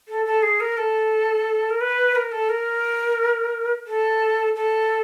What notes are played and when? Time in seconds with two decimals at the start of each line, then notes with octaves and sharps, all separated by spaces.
0.08 A4
0.26 A4
0.42 G#4
0.60 A#4
0.77 A4
1.70 A#4
1.81 B4
2.15 A#4
2.32 A4
2.49 A#4
3.87 A4
4.55 A4